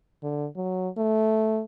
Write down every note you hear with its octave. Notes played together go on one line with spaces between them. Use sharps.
D3
F#3
A3